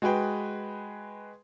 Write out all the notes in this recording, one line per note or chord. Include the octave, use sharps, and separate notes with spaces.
G#3 F#4 G#4 B4 G5